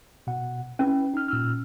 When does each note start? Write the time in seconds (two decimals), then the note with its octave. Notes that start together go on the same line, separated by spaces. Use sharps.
0.27 B2 F#5
0.79 C#4 E4 B4
1.14 D#4 F6
1.28 A#2 E6 F6